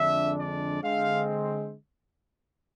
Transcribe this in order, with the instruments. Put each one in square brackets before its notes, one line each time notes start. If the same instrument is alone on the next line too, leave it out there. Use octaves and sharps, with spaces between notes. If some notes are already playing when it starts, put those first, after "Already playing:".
Already playing: [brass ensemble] F2 D3 G#3 D4 E5
D5
D3 G#3 C4 F5